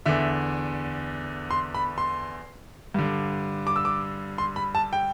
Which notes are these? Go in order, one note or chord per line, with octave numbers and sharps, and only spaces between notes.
E2 D3 E5
C6
B5
C6
G2 D3
D6
E6
D6
C6
B5
A5
G5